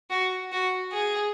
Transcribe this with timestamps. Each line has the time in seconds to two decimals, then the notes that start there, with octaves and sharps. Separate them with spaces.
0.10 F#4
0.52 F#4
0.92 G#4